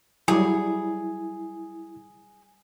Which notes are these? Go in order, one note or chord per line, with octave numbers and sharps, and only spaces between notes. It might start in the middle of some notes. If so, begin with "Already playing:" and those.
F#3 G3 E4 G#4